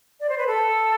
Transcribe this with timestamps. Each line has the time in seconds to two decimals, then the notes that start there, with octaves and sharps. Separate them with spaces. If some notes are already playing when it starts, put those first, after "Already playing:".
0.20 D5
0.29 C5
0.38 B4
0.47 A4